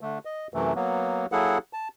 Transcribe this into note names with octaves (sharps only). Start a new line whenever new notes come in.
D3 A3
D#5
F#2 C3 E3 A3
F#3 A#3 B3
F#3 A#3 E4 G#4 A4 F#5
A5